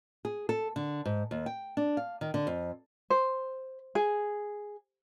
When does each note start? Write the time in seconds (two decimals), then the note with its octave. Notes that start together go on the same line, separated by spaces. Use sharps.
0.25 G#4
0.49 A4
0.76 D3
1.05 G#2
1.31 D#2
1.46 G5
1.77 D4
1.97 F5
2.21 D#3
2.34 D3
2.47 F2
3.10 C5
3.95 G#4